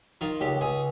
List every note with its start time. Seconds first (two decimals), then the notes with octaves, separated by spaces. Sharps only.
0.21 D#3 F4
0.41 C#2 G4
0.61 C#2 G#4